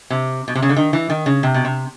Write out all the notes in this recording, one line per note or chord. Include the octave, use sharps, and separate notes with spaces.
C3
B2
C3
C#3
D3
D#3
E3
D#3
C#3
C3
B2
C3